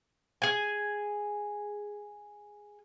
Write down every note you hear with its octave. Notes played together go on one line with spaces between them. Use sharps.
G#4 G#5